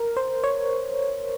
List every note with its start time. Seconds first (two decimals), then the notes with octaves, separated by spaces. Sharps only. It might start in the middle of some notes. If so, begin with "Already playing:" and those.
Already playing: A#4
0.17 C5
0.44 C#5